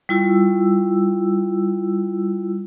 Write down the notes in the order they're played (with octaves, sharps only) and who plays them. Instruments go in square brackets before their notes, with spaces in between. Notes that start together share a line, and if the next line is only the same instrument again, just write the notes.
[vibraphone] G3 E4 F4 E6